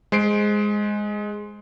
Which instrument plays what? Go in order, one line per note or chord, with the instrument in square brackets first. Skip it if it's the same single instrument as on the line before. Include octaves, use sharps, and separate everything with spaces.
[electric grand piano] G#3 C5 C7 D7